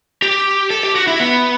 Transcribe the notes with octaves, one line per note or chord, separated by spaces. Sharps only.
G4
A4
G4
F#4
E4
B3